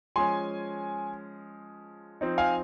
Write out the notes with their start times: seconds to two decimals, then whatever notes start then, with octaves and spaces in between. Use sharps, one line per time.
0.16 F3 G#3 C#4 G#5 C6
2.21 F3 C4 D#4
2.38 F5 G#5